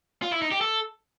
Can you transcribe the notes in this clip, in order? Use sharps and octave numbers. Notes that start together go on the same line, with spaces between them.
F4
E4
D#4
G4
A4